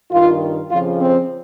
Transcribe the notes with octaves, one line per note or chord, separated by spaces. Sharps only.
G2 D#3 F4
F2 C#3 F3 F4
C4